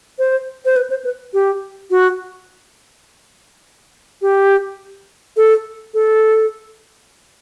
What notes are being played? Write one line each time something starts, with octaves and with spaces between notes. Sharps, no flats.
C5
C5
B4
C5
B4
G4
F#4
G4
A4
A4